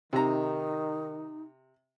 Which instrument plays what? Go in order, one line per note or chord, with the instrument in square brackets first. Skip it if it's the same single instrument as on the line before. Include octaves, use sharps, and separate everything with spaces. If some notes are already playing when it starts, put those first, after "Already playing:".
[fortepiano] C3 A#5 [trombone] D#3 [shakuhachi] D#4